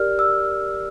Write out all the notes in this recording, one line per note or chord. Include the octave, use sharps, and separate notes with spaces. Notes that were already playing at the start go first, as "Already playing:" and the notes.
Already playing: G4 A#4 D5 F6
E6